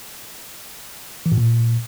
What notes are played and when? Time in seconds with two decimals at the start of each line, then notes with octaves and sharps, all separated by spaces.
1.26 E3
1.32 A2
1.38 A#2